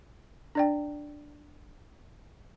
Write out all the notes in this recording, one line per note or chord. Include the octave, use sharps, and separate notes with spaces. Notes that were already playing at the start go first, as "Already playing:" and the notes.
D4 D5 G5